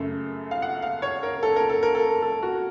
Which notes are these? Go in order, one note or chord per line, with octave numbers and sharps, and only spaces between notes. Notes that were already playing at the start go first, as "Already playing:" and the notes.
Already playing: F#2 C#3 A3
F5
F#5
F5
C#5
A#4
A4
A#4
A4
A#4
A4
A4
F#4